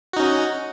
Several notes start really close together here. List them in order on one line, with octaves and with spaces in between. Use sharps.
F#4 D#4 C#4